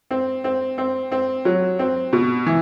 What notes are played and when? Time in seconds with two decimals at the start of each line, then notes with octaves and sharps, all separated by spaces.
0.11 C4
0.44 C4
0.78 C4
1.12 C4
1.45 F#3
1.79 C4
2.13 B2
2.46 E3